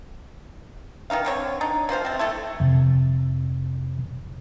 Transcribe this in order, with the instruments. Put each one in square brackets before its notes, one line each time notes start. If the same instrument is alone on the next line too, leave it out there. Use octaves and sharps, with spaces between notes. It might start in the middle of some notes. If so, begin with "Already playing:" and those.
[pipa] D#3 E3 D#4 F5
D3 C4 C#5
D4 D#4
B2 F4 C5 F5
A3 C4
A3 E4 A4
[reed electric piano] F2 C3